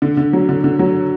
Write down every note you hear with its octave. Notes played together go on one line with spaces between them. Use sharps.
D3
D3
F#3
D3
D3
F#3